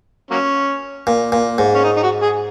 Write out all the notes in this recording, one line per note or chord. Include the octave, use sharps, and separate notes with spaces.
F#3 A#3 C#4
A#2
A#2
G#2
C#4
D#4
D#4
F#4
G#4